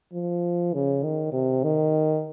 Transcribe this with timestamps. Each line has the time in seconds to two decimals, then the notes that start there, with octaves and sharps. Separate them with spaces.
0.13 F3
0.74 C#3
1.03 D#3
1.32 C3
1.63 D#3